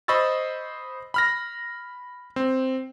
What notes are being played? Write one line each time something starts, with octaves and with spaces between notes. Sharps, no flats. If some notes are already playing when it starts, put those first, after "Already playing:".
C5 D#5 B5 C#6 E6 A6
B5 F6 A#6
C4